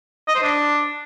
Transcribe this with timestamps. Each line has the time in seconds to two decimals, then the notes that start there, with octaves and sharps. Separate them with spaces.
0.28 D#5
0.35 C5
0.43 D4